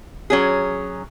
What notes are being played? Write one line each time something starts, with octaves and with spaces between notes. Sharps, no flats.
F#3 C#4 G#4